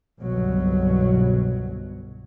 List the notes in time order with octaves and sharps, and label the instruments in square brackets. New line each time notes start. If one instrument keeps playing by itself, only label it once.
[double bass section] G1 C2 B2 F#3